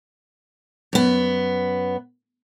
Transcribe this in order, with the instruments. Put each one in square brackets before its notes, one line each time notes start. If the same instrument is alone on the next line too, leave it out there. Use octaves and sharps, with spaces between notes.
[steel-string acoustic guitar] F#2 B3